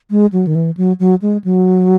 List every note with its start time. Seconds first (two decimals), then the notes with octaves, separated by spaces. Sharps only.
0.11 G#3
0.33 F#3
0.47 D#3
0.55 E3
0.77 F#3
1.00 F#3
1.22 G#3
1.44 F#3